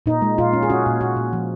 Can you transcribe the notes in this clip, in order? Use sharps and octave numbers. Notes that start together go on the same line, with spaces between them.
A#2 D#4
G#3
A#2 F4
C#4
G#4
C#4 F#4
A#2
A#2 F#4
A#2
F3